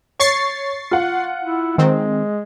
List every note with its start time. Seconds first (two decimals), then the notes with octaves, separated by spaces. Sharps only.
0.20 C#5 C#6 A6 C7
0.91 F4 F#5
1.44 E4
1.78 D#3 G#3 C4